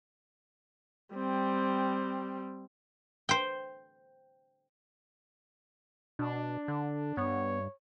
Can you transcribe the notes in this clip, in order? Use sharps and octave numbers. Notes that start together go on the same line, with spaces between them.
G3 C4
C5 G5
B2 D4
D3
G2 B3 C#5